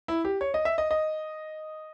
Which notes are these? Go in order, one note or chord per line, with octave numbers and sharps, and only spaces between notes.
E4
G4
C#5
D#5
E5
D#5
D#5